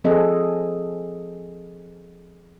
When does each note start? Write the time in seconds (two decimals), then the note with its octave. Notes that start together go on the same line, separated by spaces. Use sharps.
0.04 F3 C4 G#4 A4 D#5